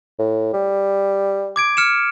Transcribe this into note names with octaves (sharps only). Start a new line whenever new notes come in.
A2
G3
D6 G#6 D7
F6 C#7 E7